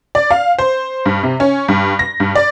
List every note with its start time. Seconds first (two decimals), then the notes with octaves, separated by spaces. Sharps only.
0.15 D5
0.31 F5
0.58 C5
1.06 G2
1.23 C3
1.40 C#4
1.68 G2
1.99 A#6
2.20 G2
2.35 D5